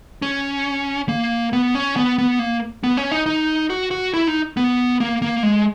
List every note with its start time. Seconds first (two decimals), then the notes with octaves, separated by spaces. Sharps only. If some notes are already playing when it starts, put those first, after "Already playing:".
0.22 C#4
1.09 A#3
1.53 B3
1.75 C#4
1.96 B3
2.18 B3
2.39 A#3
2.84 B3
2.97 C#4
3.11 D#4
3.26 D#4
3.70 F#4
3.91 F#4
4.14 E4
4.28 D#4
4.57 B3
5.00 A#3
5.22 A#3
5.43 G#3